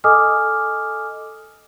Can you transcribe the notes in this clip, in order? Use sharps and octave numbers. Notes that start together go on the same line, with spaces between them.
A4 D#5 G#5 D6 D#6 F6